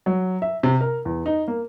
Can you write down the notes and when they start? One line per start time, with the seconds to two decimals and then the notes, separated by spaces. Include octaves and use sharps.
0.06 F#3
0.42 E5
0.63 C3
0.81 A#4
1.05 E2
1.26 D#4
1.48 A#3